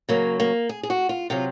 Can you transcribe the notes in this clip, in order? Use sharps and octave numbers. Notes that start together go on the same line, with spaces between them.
C#3 F#3 A#3
A#3
G#4
G#4
F#4
F4
C3 F#3 F4